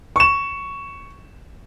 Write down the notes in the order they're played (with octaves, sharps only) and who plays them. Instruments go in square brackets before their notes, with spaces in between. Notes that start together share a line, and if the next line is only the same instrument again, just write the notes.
[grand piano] C#6 E7